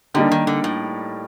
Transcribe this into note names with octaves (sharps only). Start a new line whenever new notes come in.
D3 G3 A#3 D#4 G4
D#3
D3
A2